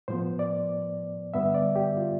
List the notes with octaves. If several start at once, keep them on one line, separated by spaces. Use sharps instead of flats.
A2 F3 B3 C5
D5
G2 D3 G3 B3 E5
D5
G4
F4